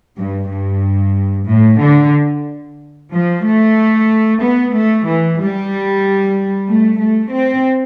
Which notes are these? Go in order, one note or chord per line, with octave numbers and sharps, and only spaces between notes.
G2
G2
A2
D3
F3
A3
B3
A3
E3
G3
A3
A3
C4